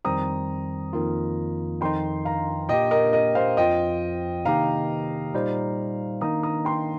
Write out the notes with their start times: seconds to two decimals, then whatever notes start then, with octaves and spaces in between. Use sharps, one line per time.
0.05 F2 D#3 G3 C4 A#5 D#6
0.93 F2 D#3 A#3 F4
1.81 F2 D#3 C4 D#4 G5 C6
2.25 F5 A#5
2.69 A#2 A#3 G4 D#5 G5
2.91 A#4 D#5
3.13 A#4 D#5
3.35 C5 F5
3.57 F2 F3 C4 F4 D#5 G5
4.45 C3 D#3 A#3 D#4 G4 F5 A#5
5.34 A#2 G3 D#4 C5
6.21 D#3 A#3 D#4 A#5 D#6
6.43 A#5 D#6
6.65 G5 C6